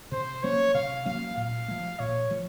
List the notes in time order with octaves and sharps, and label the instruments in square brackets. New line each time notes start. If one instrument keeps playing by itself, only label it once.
[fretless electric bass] C3 [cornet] C5
[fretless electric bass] F#3 A#3 C#4 [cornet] C#5
[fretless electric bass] C3 [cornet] F5
[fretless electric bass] F#3 A#3 C#4 [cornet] F5
[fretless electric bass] A#2 [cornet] F5
[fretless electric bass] F3 A3
[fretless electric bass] A#2 [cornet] C#5
[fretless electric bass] F3 A3